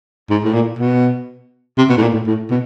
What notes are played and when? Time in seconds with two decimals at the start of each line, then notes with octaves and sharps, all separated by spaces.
0.30 G#2
0.44 A2
0.53 A#2
0.79 B2
1.78 C3
1.89 B2
1.97 A2
2.02 A#2
2.14 A2
2.27 A2
2.51 B2